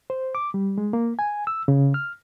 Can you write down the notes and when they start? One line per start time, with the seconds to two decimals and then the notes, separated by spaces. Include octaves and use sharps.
0.10 C5
0.35 D6
0.54 G3
0.78 G#3
0.93 A#3
1.19 G#5
1.47 E6
1.68 C#3
1.94 F6